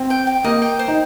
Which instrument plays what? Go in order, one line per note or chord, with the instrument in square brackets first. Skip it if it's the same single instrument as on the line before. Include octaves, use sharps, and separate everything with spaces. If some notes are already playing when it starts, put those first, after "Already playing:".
Already playing: [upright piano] C4
[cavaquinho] G5
G5
[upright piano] A#3 [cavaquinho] D#5
[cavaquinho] G5
C5
[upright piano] D#4